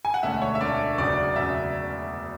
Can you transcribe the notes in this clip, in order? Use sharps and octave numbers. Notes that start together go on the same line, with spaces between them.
G#5
F#5
E1 D2 D3 A3 C#4 E5
C#5
E5
E1 D2 D3 A3 C#4 D5
F#1 E2 C#3 F#3 C#4 D5
F#1 E2 C#3 F#3 C#4 E5